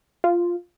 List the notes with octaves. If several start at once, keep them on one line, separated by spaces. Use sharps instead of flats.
F4